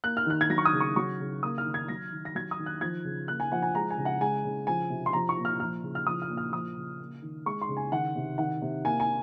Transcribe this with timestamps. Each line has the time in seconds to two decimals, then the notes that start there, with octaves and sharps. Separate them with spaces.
0.04 A#3 F#6
0.17 F6
0.26 D#3 F#6
0.41 G#6
0.50 F#3 A#6
0.58 C#6
0.65 D#6
0.73 C#3
0.80 C#6
0.96 F#3 C#6
1.20 C#3
1.43 A#3 D#6
1.58 F6
1.65 D#3
1.74 G#6
1.88 F#3 A#6
2.12 D#3
2.25 A#6
2.35 F#3 G#6
2.51 D#6
2.59 D#3
2.66 F#6
2.81 F3 G#6
3.05 C#3
3.28 A#3 F#6
3.40 G#5
3.52 F3 F#5
3.62 G#5
3.75 G#3 A#5
3.91 G#5
3.98 C#3
4.05 F#5
4.21 G#3 G#5
4.45 C#3
4.67 F3 G#5
4.90 C3
5.06 C6
5.13 F3 A#5
5.29 C#6
5.37 A#2
5.45 F6
5.60 F3 F6
5.83 C#3
5.95 F6
6.06 F3 D#6
6.22 F6
6.29 A#2
6.37 F6
6.52 F3 D#6
6.77 C#3
6.99 A#3
7.22 D#3
7.46 G#3 C#6
7.62 C6
7.69 C#3
7.77 G#5
7.92 D#3 F#5
8.15 C3
8.38 D#3 F#5
8.62 C3
8.85 A#3 G#5
9.00 G#5